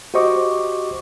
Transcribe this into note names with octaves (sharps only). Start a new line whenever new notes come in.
F#4 G4 C5 D#5 C#6 D6